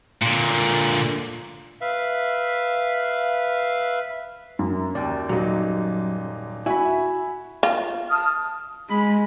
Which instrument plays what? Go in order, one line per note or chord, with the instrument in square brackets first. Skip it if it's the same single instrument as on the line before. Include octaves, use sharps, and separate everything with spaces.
[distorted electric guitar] A#2 D3
[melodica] B4 E5 F5
[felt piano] F#2
[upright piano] D#2 [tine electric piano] D5 G5
[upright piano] D#1 G3 D#4 [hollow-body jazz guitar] F#3
[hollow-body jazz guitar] E4 [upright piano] F#4 [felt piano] E5 [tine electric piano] G#5 B5
[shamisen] F4
[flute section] A5 D#6 F6
[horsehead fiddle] G#3 [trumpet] B5